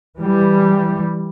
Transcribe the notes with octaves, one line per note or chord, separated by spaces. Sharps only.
E3 G3